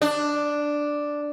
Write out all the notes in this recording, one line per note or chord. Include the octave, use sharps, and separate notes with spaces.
D4